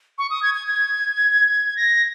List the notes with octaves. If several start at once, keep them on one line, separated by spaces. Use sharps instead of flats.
C#6
D#6
G#6
G#6
G#6
A#6